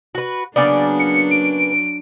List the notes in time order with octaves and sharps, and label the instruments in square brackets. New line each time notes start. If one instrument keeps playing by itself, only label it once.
[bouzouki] F#4 B4
[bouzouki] C#3 A#3 B3 [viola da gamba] F#3 D4 [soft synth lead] D5
[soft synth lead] C#7
D7